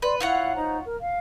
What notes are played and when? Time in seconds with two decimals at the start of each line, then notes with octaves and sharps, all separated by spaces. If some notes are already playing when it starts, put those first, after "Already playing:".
0.02 B4 D5 C6
0.20 E4 F4 C#5 F5 F#5
0.55 D#4 C5 A#5
0.85 A#4
1.00 F5